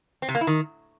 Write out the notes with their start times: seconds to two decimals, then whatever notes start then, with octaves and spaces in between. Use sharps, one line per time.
0.22 C4
0.29 C3
0.35 A#3
0.41 E4
0.47 D#3